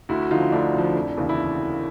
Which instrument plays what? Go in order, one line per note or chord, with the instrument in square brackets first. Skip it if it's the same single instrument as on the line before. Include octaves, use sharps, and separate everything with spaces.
[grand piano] D2 E4 F#4
D3 F3 D#4 F4
D2 D4 E4
D3 F3
F1
D#2 C#3 E3
E4